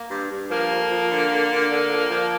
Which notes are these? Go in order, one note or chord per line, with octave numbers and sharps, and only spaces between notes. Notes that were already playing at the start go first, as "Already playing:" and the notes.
Already playing: A#3
G2
G2
F3 A#3
F2
F3
D3
D3
D3
D3
F2
F3